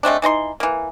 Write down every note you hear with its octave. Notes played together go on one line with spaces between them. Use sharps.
G#3 A3 C4 D4
E3 D#4 A#5 C6
E3 A#3